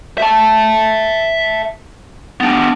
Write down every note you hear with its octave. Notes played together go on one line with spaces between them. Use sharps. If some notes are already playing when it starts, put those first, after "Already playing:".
E5 A5
B3 D4